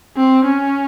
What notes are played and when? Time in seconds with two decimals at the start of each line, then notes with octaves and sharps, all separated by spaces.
0.17 C4
0.45 C#4